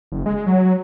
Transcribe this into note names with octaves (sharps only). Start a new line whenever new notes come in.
F#1
G#3
F#3